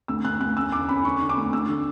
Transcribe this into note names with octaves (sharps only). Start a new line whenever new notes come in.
D2 E6
D2 F#6
D2 F#6
C#4 E6
E2 D6
C#4 B5
D3 C#6
D3
D6
D2
D2 E6
D3